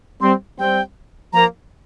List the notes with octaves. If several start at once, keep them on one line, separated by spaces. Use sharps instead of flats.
G3 C4 C6
G3 C4 G5
F3 A#3 A#5